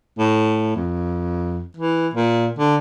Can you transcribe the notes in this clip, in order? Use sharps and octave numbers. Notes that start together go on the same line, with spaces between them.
A2
F2
E3
A#2
D3